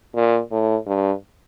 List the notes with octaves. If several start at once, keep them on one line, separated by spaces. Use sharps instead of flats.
A#2
A2
G2